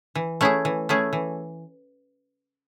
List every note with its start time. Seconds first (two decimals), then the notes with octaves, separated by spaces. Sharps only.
0.15 E3
0.41 A3 C#4 E4 G#4
0.65 E3
0.89 A3 C#4 E4 G#4
1.13 E3